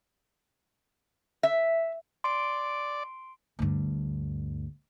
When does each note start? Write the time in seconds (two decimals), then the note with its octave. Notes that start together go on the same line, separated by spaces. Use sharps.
1.43 E5
2.24 D5 C6 D7
3.59 D2 G2